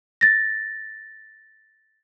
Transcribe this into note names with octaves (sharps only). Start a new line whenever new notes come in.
A6 A#6